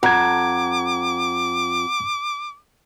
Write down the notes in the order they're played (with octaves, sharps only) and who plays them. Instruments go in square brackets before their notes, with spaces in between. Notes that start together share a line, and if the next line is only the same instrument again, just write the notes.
[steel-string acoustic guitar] F2 [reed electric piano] F#5 A#5 G#6 [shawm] D6